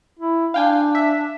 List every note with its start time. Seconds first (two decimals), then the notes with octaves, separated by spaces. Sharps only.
0.19 E4
0.54 D4 F5 G5 G#5
0.95 E5